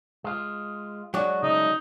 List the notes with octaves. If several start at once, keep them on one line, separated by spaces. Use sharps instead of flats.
G#3 F4
F#3 G#3 D4 F#4
C#3 A3 D#4